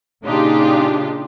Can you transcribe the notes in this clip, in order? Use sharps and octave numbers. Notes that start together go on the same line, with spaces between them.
A#2 C#3 D4 D#4 F4 G4